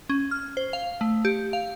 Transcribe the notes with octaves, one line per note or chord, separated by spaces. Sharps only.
C#4
F6
C5
F5
A3
G4
F5